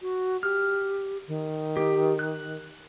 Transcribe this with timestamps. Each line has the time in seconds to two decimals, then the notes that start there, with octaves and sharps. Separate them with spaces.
0.01 F#4
0.43 G4 F6
1.28 D#3
1.77 G4
2.19 F#6